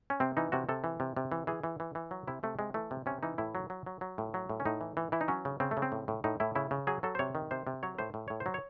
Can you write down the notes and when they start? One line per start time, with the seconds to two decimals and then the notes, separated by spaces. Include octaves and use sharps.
0.10 C#4
0.20 C3 C4
0.37 E3 D#4
0.52 C3 F#4
0.69 C3 A4
0.84 E3
1.00 C3
1.17 C3
1.32 E3
1.47 E3 G#4
1.63 E3
1.80 E3
1.95 E3
2.11 F#3
2.27 C3 E4
2.43 C3 A3
2.59 C3 G#3
2.74 E3 A3
2.91 C3
3.06 C3 C#4
3.23 E3 D#4
3.38 A2 E4
3.55 F#3
3.70 F#3
3.86 F#3
4.01 F#3
4.18 A2
4.34 F#3
4.49 A2
4.60 C#4
4.65 A2 D#4
4.81 E3
4.97 E3
5.12 E3 E4
5.21 D#4
5.28 F#3 C#4
5.45 C#3
5.60 C#3 C4
5.71 A3
5.77 C#3
5.82 C4
5.92 A2
6.08 A2
6.24 A2 D#4
6.40 A2 E4
6.55 C#3 E4
6.71 C#3
6.87 F#3 G#4
7.03 F#3 A4
7.15 C5
7.19 C3 C#5
7.35 D#3
7.51 C3 C5
7.67 C3
7.83 F#3 C#5
7.99 A2 C5
8.14 A2
8.28 A2 C#5
8.40 C5
8.46 F#3
8.54 C#5